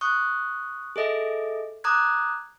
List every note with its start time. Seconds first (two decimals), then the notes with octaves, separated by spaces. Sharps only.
0.01 C#6 D#6 F#6
0.96 G#4 A4 D#5 E5
1.84 A#5 D6 D#6 F#6 G#6